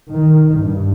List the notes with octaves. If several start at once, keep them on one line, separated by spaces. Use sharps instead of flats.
D#3
G2